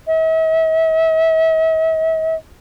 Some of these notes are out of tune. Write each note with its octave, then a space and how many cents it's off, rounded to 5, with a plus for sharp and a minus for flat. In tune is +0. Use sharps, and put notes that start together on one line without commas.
E5 -45